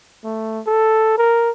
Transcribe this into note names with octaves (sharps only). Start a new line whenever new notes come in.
A3
A4
A#4